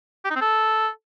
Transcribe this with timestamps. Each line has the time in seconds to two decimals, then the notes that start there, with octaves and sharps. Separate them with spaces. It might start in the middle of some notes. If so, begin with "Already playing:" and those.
0.25 G4
0.30 D#4
0.36 C4
0.41 A4